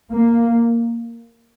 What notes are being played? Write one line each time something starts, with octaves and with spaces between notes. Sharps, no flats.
A#3